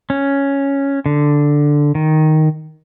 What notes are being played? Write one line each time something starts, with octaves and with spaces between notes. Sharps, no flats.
C#4
D3
D#3